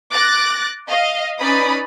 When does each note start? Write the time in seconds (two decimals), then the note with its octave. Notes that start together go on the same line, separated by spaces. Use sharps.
0.13 D6 F#6 A6 A#6
0.89 D#5 F5
1.41 C#4 D#4 B4 D5 B5 D#6